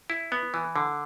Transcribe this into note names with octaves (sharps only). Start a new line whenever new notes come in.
E4
B3
E3
D3